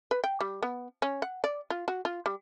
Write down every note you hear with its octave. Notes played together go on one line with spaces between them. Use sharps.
B4
G5
G3
B3
C#4
F#5
D5
F4
F#4
F4
G3